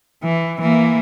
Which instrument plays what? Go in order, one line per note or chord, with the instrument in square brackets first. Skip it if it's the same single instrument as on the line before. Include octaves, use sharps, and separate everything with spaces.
[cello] E3
E3 A#3